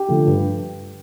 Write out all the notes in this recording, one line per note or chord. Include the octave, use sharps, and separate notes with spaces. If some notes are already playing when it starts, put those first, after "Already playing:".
Already playing: G4
D3 F3 A3
G2